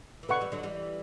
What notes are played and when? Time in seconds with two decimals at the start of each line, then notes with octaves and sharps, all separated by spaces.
0.23 E3
0.29 B2 D3 B4 F#5 C#6
0.41 E3 G3
0.52 D3 F#3
0.63 E3 G3